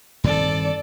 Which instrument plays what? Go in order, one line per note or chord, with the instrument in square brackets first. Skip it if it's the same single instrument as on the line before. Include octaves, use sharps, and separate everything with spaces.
[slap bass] G2 D#3 C4 [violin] A4 D5